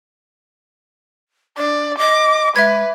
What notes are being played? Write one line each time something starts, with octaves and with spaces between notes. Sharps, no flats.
D4 D5
D#5 D6
G#3 B4 E5 G#6